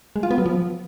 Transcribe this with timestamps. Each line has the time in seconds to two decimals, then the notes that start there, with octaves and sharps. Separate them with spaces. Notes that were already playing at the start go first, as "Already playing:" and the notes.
0.16 G#3
0.23 F4
0.31 B3
0.38 F#3
0.46 F3